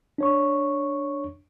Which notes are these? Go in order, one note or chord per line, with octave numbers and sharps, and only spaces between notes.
D4 C#5 C#6